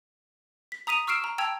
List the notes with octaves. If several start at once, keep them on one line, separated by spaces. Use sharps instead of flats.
B6
A#5 D#6 B6 D#7 F7
C#6 E6 F6 C7 D7 E7
A#5
G5 A5 E6 G#6 F7